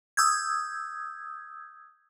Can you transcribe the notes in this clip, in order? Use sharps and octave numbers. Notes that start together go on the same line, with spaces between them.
D#6 E6 G6 G#6